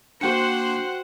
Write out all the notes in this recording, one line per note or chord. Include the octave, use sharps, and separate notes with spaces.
A#3 D4 F#4 C5 F#5 G5 C#7